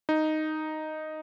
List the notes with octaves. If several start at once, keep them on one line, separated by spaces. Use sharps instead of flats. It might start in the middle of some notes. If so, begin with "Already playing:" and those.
D#4